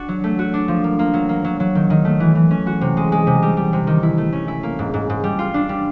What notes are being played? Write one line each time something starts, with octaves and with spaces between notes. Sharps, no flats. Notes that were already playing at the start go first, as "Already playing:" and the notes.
Already playing: D4 F#4
F#3
A3
F#4
D4
F3
A#3
A#3
F#3
A#3
F#3
F#3
D#3
D#3
A3
E3
E3
C#4
F#4
C3
G#3
G#3
C3
G3
G3
C3
D#3
E4
A3
C#4
E4
A#3
G#2
G#2
G#2
G3
F4
D4
G3